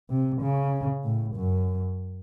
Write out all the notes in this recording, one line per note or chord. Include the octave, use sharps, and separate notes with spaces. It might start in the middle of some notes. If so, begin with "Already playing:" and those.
C3
C#3
A2
F#2